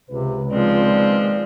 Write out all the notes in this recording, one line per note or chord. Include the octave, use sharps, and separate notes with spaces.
C#2 C3 B4
A#2 D#3 F3 G#3 C4 D5